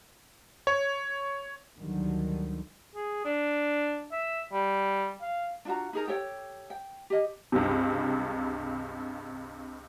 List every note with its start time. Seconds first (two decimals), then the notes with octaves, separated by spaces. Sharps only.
0.67 C#5
1.78 D2 D3 D#3 F#3 G3
2.95 G#4
3.25 D4
4.12 E5
4.53 G3
5.21 F5
5.65 D4 F4 F#4 A#5
5.93 D#4 G#4 A#4
6.07 G4 A4 C#5 G5
6.70 G5
7.10 G4 D#5
7.52 C#2 G2 C3